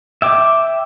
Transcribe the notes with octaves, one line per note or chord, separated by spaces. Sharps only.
E5 G5 D6